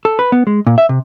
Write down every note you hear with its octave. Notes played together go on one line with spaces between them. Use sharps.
A4
B4
B3
G#3
A#2
E5
C3